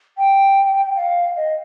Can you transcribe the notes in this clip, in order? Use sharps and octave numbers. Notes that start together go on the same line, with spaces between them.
G5
F5
D#5